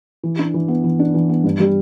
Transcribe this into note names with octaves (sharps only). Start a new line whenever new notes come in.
E3
D4
E3
B3
E3
D4
E3
B3
G2
G3